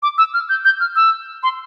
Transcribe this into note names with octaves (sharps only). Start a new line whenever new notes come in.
D6
E6
F6
G6
G6
F6
E6
C6